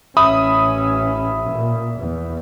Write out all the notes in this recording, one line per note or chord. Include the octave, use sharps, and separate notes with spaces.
A1 C#4 E5 B5 D#6
A#2
E2